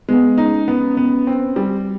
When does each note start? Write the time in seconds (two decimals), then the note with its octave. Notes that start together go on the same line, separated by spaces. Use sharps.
0.09 G#3 B3
0.38 C#4 D#4
0.68 B3
0.97 B3
1.27 C4
1.56 G3